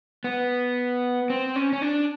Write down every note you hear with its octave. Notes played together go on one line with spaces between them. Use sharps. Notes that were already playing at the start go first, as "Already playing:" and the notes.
B3
C4
C#4
C#4
D4